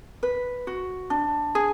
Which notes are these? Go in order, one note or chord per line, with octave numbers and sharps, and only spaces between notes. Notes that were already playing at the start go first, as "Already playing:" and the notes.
B4
F#4
D4
G#4